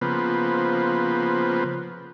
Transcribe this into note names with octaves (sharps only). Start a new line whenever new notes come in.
C#3 F3 A#3 B3 B4 C5